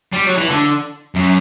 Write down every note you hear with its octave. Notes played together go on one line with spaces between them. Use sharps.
G3
F#3
E3
D3
F#2